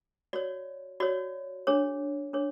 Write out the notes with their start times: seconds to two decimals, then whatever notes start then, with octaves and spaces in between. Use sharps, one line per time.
0.33 F#4 C#5 D5
1.00 F#4 C#5 D5
1.67 D4 G#4 C#5
2.33 D4 G#4 C#5